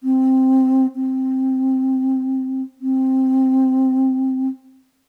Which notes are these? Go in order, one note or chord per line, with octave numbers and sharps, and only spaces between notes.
C4
C4
C4